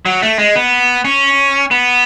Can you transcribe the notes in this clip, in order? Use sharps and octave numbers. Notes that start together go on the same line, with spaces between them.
F#3
A3
G#3
B3
C#4
B3